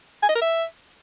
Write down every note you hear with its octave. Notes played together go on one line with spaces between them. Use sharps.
G#5
D#5
A#4
E5